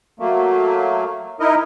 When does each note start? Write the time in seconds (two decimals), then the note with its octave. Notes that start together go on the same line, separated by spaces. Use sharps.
0.20 F#3 A3 A#3
1.40 D#4 E4 A#4 D#5